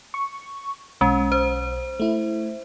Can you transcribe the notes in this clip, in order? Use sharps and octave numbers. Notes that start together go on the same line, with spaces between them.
C#6
B1 G#3 C#4
C5
A3 E4